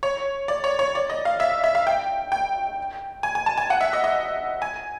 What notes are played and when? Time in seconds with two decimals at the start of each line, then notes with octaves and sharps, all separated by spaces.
0.03 C#5
0.48 D5
0.64 C#5
0.79 C#5
0.95 D5
1.10 D#5
1.25 F5
1.40 E5
1.64 E5
1.75 F5
1.87 G5
2.32 G5
3.23 G#5
3.35 G#5
3.46 A5
3.58 G#5
3.70 F#5
3.81 E5
3.93 D#5
4.04 D#5
4.62 G#5